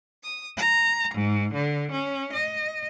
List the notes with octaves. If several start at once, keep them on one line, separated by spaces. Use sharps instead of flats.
D#6
A#5
G#2
D3
C#4
D#5